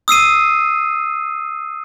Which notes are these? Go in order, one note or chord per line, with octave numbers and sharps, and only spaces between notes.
D#6 E6 C7 D#7